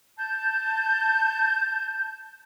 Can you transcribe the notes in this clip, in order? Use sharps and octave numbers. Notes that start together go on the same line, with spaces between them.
A5 G6